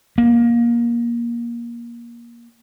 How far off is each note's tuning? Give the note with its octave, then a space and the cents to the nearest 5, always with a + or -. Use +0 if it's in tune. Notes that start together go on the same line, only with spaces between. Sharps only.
A#3 +20